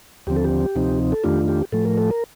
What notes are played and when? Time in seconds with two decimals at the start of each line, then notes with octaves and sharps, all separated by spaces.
0.27 D#2 D3 F3 C4 G4
0.36 A4
0.45 G4
0.76 D2 C3 F3 C4 D#4
1.12 A4
1.24 F2 D#3 A3 D4 F4 G4
1.48 G4
1.72 A2 F3 A3 A4
1.85 A#4
1.98 A4
2.11 A#4